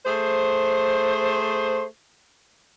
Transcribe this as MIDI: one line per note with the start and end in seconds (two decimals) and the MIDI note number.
0.05 1.83 57
0.05 1.83 68
0.05 1.83 72